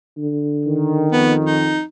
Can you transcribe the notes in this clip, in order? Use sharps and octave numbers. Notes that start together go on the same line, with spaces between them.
D3
D#3
F2 B3
D#4